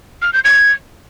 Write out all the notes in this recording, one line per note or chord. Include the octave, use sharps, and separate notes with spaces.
F6
G6
G#6